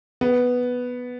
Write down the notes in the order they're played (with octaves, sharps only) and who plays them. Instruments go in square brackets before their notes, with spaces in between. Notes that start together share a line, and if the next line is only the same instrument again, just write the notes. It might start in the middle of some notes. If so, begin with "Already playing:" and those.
[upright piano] B3